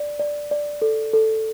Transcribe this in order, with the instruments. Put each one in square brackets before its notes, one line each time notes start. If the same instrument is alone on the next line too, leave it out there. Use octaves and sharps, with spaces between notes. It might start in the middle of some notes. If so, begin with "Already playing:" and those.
Already playing: [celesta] D5
D5
D5
A4
A4